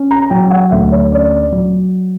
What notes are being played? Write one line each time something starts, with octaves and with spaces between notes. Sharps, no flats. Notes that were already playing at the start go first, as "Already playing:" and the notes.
Already playing: C#4
A#5
F#3 G5
F#5
D2 E5
C#5
C#4 D5
F#3